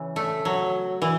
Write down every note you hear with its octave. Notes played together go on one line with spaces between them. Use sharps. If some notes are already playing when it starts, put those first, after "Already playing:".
Already playing: C#3 E3
A3
F#3
E3